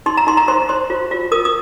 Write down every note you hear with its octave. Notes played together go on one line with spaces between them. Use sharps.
D#4 C6
A#5
D#4 C6
A#5
C5 C6
C5 C6
F4
F4
A#4 D#6
D#6